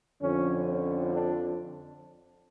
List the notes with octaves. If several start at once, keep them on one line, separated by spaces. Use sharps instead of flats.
F2 D3 F3 C#4
C#4
D4